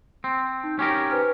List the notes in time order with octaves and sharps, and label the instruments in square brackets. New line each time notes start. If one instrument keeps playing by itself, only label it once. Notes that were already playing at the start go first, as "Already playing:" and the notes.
[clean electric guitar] C4
[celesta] D#4 G6
[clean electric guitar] C#4 G4 A#4
[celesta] B4 C5 F6